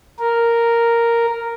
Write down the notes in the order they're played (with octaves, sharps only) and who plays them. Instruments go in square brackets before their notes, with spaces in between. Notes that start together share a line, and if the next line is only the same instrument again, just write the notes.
[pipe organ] A#4